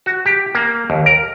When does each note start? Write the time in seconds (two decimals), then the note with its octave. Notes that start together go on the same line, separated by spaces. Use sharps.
0.06 F#4
0.26 G4
0.55 A#3
0.90 D#2
1.06 A#4